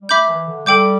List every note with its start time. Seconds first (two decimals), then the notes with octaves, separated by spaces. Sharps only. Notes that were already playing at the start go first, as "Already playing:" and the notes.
0.01 G3
0.09 A3 E5 B5 D6 G6
0.28 E3
0.47 D3
0.66 G3 A4 G5 D6 G6